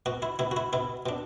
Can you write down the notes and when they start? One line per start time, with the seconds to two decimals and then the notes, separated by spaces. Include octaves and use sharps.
0.06 B2 F#4
0.22 E4
0.39 B2 E4
0.51 F#4
0.57 E4
0.73 B2 E4
1.06 B2 D4